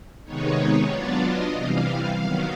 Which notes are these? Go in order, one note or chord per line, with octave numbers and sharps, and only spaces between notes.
C3 D#3 G#3 B3 D#4 C#5
F#3 B3 D4 F4 D5
D#5
C3 E3 G3 F5
D#3 F#3 B3